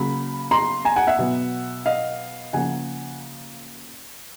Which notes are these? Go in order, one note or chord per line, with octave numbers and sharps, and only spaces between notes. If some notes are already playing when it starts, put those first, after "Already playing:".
Already playing: C#3 F#3 A#3 B5
A#5 C6
G#5 A#5
F#5 G#5
E5 F#5
B2 F#3 B3
D#5 F5
C#3 F3 A#3 F#5 G#5